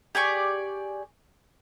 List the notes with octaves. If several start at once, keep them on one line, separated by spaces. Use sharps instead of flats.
G4 G#4 D5 C#6